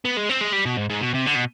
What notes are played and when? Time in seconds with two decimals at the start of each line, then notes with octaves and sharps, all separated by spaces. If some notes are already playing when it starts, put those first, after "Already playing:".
0.05 B3
0.17 G#3
0.30 C4
0.41 G#3
0.53 G3
0.66 B2
0.77 G#2
0.89 G#2
1.01 B2
1.14 C3
1.26 D3
1.35 B2